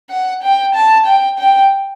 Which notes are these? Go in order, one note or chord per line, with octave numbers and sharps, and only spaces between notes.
F#5
G5
A5
G5
G5